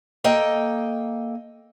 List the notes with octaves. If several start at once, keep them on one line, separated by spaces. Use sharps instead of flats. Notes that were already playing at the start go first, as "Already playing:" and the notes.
A#3 A4 D#5 G5